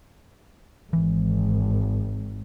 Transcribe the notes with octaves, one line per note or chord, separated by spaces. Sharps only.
G#1 E3